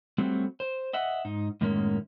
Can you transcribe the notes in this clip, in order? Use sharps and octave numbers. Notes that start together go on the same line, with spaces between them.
F#3 G3 A3 C4 F#4
C5
D#5 E5 F#5
G#2 D#4
F#2 A2 D#3 G#3 A#3 C#4